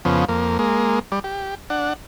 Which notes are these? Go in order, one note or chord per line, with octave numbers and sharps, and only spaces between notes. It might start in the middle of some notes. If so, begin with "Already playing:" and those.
F2 C#3 F3 B3
F2 A#3
G#3 A#3
G3 D5
G4
D4 F#5